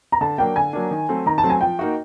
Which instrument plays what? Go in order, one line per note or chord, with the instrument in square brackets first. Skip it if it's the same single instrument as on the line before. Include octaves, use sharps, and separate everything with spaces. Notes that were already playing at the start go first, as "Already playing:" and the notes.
[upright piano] A#5
[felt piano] D3 [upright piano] A5
[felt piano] F#3 A#3 D4 [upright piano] G5
[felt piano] D3 [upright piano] G#5
[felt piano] F#3 A#3 D4
D#3
F#3 A3 C4
[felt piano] D#3 [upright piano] A#5
[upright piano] A5
[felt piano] F#3 A3 C4
[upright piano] G#5
[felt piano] F3 [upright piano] G5
[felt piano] A#3 D#4 F#4